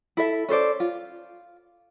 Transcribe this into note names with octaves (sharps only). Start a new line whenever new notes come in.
E4 A4 E5
C#4 A4 C5 D5
F4